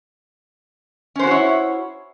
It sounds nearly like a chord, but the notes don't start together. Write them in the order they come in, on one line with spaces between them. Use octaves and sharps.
C#4 C5 F#4 C#5 E4